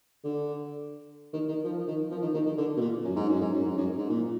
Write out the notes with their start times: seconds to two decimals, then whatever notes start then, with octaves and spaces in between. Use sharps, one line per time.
0.24 D3
1.33 D#3
1.48 D#3
1.64 F3
1.87 D#3
2.11 F3
2.22 D#3
2.34 D#3
2.46 D#3
2.57 D3
2.76 B2
2.81 A#2
3.04 F#2
3.16 G#2
3.29 F#2
3.41 G#2
3.53 F#2
3.65 G#2
3.78 F#2
3.97 G#2
4.09 A#2